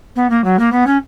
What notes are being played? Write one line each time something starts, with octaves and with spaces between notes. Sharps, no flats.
B3
A#3
F#3
A#3
B3
C#4